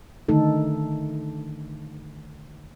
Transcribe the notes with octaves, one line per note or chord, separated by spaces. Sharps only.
D3 D#3 A3 D#4 A4